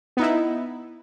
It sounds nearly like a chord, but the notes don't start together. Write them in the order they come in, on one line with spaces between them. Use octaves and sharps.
B3 D#4 E4